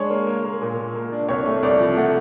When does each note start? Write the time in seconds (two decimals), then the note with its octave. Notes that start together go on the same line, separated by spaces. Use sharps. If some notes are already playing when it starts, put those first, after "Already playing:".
Already playing: G#3 D4 C#5
0.10 A#3
0.27 A#3
0.44 A#3
0.61 A#2
0.78 A#2
0.95 A#3
1.12 D4
1.29 C2 C#5
1.46 A3
1.63 C2 D5
1.80 F3
1.97 A3 F#5